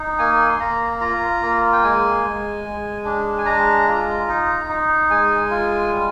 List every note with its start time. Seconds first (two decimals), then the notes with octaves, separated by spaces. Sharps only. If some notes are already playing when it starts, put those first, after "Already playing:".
Already playing: D#4
0.19 A#3 G#5
0.49 C6
0.60 A#3 A#5
1.01 F4 A#5
1.42 A#3
1.72 G5
1.83 G#3 G#5
2.24 G#3
2.65 G#3
3.05 D4
3.38 G#5
3.46 G#3 A#5
3.87 F4
4.28 D#4
4.68 D#4
5.10 G#3 G#5
5.50 F4
5.92 G3